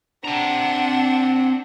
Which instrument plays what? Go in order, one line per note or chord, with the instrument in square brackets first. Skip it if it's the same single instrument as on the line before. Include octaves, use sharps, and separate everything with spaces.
[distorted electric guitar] C4 A#5 [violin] D4 F#5